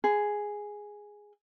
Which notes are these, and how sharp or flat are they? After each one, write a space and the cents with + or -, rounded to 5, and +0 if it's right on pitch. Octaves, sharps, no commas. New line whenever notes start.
G#4 +0 B5 +45